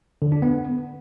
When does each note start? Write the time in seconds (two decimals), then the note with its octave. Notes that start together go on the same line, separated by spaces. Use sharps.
0.22 D3
0.32 D4
0.42 B3